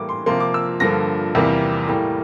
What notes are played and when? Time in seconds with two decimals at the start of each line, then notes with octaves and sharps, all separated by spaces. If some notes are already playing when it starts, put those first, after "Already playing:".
Already playing: A2 E3 G3 A#3 D6
0.09 C6
0.26 C3 F3 A#3 C6
0.40 D6
0.54 E6
0.80 G2 D3 F3 A#3 A#6
1.35 E2 C3 G3 A#3
1.88 A2 G3 A#3